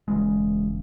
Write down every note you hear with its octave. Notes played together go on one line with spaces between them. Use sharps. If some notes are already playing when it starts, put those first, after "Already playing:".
E1 E2 C#3 G#3